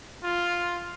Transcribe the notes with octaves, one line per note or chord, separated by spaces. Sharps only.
F4